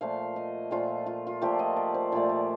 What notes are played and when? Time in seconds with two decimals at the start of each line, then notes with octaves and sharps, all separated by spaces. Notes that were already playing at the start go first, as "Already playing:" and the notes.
0.01 A#2 F3 A3 F5
0.36 D#5
0.71 A#2 F3 A3 F4
1.06 F4
1.27 F4
1.41 A#2 F3 A3 G4
1.59 D#5
1.77 D5
1.94 C5
2.12 A#2 F3 A3 D5
2.29 A#4